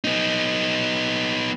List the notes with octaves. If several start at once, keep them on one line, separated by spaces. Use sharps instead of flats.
B3 D#4